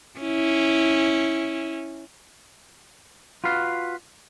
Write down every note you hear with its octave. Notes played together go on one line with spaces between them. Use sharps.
C#4 E4
F4 F#4 B4 F5